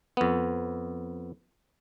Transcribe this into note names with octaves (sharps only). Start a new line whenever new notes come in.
F2 B3